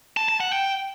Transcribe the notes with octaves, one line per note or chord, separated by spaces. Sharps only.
A5
A5
F#5
G5